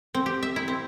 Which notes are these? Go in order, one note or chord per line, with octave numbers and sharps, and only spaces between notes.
C4
G4
E5
E4
C4